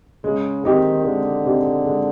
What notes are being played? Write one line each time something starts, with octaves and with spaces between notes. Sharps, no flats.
C#3 G#3
D#3 C4 D#4 G4
D3 G#3
C4 D#4 G4
G#3